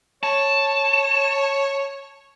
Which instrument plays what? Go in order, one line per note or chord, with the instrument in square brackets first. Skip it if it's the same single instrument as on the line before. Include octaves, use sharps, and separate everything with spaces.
[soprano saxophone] C#5 [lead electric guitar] A5